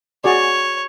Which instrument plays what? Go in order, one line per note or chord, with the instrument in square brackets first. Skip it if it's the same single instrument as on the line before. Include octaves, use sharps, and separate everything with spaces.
[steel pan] F#4 G#4 D5 [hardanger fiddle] C#5